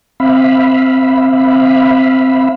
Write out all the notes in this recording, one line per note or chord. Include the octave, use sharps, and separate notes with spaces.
C4 E5 F5 B5